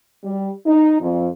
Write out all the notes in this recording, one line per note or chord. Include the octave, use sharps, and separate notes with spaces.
G3
D#4
F2